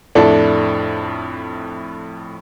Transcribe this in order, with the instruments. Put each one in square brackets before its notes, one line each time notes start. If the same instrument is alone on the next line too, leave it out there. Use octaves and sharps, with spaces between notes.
[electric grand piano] F2 A2 [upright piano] D4 E4 A4